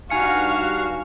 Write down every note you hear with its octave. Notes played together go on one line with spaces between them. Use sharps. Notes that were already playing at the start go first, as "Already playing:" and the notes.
G2 D#4 F#4 F5 G#5 F6 C#7